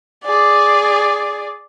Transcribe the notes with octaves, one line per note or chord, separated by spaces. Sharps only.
G#4 D5